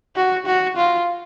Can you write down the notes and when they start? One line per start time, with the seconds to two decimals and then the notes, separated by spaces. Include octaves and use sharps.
0.16 F#4
0.46 F#4
0.77 F4